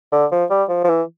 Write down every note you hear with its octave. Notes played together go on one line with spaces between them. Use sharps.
D3
F3
G3
F3
F3
E3